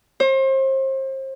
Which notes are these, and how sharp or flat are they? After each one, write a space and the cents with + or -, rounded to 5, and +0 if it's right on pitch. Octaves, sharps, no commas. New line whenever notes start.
C5 +35